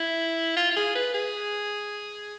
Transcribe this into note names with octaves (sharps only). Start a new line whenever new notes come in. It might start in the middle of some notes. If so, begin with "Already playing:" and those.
Already playing: E4
F4
F4
G#4
B4
G#4